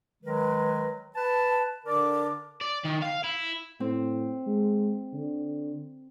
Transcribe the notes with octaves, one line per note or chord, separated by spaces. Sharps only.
D#3 F#3 G#3 A#4 B4
B4 A5
D3 D4 A#4 D5 D6
D5
D#3
F5
E4
A2 C4
G#3
D3